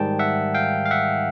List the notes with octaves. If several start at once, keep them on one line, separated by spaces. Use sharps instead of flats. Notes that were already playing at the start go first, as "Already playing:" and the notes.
Already playing: G#2 D#3 G3 G5 A5
E5 F#5
F5 G5
F5
E5 F#5